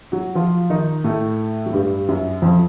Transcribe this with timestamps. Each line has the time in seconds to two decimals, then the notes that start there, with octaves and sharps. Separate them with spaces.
0.12 F#3 F#4
0.35 F3 F4
0.70 D#3 D#4
1.04 A2 A3
1.66 F#3
1.73 G2 G3
2.09 F#2 F#3
2.42 F2 F3